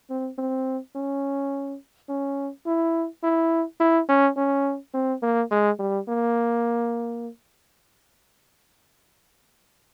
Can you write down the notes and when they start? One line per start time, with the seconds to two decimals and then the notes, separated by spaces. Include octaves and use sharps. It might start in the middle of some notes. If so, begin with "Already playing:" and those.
0.10 C4
0.38 C4
0.96 C#4
2.09 C#4
2.66 E4
3.24 E4
3.80 E4
4.09 C#4
4.37 C#4
4.94 C4
5.23 A#3
5.51 G#3
5.79 G3
6.09 A#3